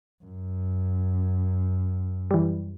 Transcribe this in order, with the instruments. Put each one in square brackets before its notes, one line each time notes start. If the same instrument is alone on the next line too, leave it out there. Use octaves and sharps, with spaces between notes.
[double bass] F#2
[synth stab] E3 G3